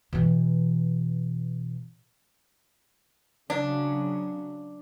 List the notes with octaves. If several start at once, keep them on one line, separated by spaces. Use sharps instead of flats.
B2 E3
C#3 F#3 D4